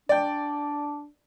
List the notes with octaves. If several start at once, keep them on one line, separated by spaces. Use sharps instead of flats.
D4 D5 G5